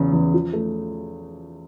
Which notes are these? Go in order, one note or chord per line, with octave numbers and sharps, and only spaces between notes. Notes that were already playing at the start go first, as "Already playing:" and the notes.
Already playing: E2 C#3
E2
F3
A3